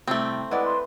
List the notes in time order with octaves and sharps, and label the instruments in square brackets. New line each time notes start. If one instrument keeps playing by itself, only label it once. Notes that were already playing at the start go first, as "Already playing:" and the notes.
[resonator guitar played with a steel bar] A2 C3 G3 [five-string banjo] A3 C4
[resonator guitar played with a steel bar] G#3 E4 D5 [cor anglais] B4 [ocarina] F#5
[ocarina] C6